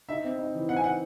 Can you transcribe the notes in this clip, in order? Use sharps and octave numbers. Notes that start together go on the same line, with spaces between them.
D#4 E5
C4
D#4
E3
C4 F#5
G#5
D#4 F#5